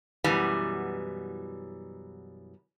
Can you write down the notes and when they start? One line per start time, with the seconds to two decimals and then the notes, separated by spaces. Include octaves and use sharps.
0.24 F#2 B2 E3 G3